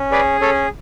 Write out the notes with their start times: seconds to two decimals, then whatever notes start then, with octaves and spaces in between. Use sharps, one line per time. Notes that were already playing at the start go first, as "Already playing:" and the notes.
Already playing: C#4
0.11 G#4 B4 D5
0.40 C#4 A4 C#5